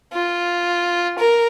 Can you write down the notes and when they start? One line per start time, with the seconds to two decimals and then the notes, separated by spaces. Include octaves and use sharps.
0.13 F4
1.19 A#4